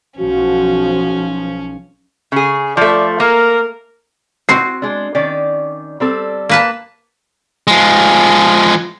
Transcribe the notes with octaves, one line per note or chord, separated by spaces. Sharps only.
B1 F3 C#4 F#4
C#3 G#4
F3 A3 D5
A#3 A#4
C4 F#4 C7
G#3 D4
D#3 C#4 D5
G3 C4 A4
A#3 B4 A5
F3 G#3